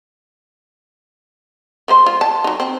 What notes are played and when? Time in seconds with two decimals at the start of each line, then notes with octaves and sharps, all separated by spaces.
1.88 F3 G#3 C5
2.06 F4
2.21 A5
2.44 F#3 D#4
2.60 C4